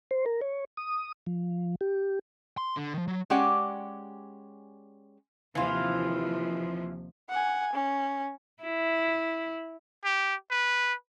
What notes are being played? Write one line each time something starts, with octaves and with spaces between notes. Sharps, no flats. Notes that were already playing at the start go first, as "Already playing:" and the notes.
C5
A#4
C#5
D#6
F3
G4
C6
D3
D#3 F3
F#3
G#3 C#4 G4 D5 F#5
D#2 C3 E3 F3 F4
F#5 G#5
C#4
E4
G4
B4